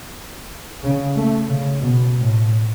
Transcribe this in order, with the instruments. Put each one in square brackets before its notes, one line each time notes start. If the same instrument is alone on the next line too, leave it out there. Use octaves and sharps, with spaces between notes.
[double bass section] C#3
A3
C#3
B2
A2